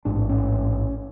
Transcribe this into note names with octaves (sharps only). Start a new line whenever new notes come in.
A1 G#2 D4
C#4